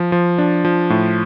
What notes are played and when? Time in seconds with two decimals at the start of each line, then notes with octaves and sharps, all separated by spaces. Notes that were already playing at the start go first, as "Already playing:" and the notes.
Already playing: F3
0.12 F3
0.38 D4
0.65 F3
0.90 A2